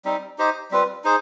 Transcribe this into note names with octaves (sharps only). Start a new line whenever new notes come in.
G3 C4 D#4
D#4 G4 C5 D#5
G3 C4 F4 B4
D#4 G#4 C5